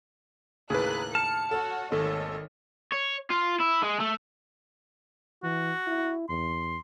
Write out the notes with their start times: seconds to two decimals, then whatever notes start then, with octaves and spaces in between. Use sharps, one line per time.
0.70 D#2 A2 C#3 G#4 A#4 B4 F#6
1.15 A5 F6 C#7
1.51 F#4 A4 C#5 F#5
1.92 G#1 D#2 D#3 A3 A4 C#5 D#5
2.92 C#5
3.30 F4
3.60 E4
3.82 G#3
4.00 A3
5.43 E3 F#4
5.87 E4
6.29 E2 C6